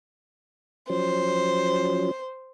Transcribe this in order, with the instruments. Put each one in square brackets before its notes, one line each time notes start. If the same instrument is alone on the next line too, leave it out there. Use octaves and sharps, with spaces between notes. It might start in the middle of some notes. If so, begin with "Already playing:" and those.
[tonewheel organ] F3 F#3 C#4 [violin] C5